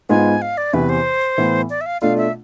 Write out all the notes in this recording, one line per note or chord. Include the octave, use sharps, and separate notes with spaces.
G#2 G#3 B3 F4 G#5
F5
D5
E2 C3 E3 B4
C5
A2 E3 B3
D5
E5
F5
B2 A3 D4 F4 F5
E5